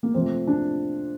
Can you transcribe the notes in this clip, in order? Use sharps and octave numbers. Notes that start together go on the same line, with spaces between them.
A#3
F2 C3 F3 A3 C4
D4